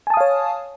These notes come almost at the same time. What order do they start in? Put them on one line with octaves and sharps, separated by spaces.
G#5 A5 D#6 F5 C#5